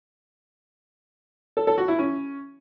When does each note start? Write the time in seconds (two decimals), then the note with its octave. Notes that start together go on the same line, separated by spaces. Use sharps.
1.57 A4
1.67 A4
1.78 F#4
1.88 E4
1.99 C#4